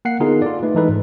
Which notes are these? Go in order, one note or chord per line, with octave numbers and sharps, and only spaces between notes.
A#3 F#5 C7
D3 B3 D#4 F4 G#4 A#4
F4 A4 D5
A3 D#4 B4
E3 G#3 D#4 A4 B4
G#2